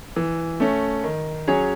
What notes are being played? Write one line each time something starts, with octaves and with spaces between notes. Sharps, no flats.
E3
A3 C#4
D#3
F#3 C#4 G#4 C#5